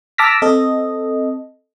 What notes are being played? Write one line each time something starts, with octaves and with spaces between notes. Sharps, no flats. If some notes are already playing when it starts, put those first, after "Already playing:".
A5 D6 E6 F6 A#6 B6
C4 A4 D#5